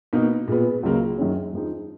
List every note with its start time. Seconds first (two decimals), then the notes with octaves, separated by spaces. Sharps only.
0.13 B2 A#3 D#4
0.47 A#2 G#3 B3
0.83 C#2 C#3 F#3 A#3
1.18 F#2 D#3 G#3 C#4
1.53 F2 F3 G#3 D#4